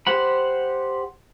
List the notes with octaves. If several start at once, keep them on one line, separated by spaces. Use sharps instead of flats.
G4 C5 F#5 B5